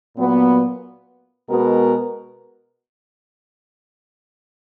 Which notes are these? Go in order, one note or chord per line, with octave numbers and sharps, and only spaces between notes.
A#2 F#3 B3
B2 G#3 B3 F#4 A#4